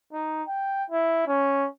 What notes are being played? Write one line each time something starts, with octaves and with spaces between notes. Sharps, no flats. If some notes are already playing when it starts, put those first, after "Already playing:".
D#4
G5
E4
C#4